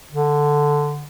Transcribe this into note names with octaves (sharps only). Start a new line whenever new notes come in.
D3